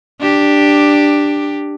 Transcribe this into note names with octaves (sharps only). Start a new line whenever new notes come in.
D4 G4